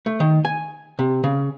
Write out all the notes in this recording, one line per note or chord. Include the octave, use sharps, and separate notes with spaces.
A3
D#3
G#5
C3
C#3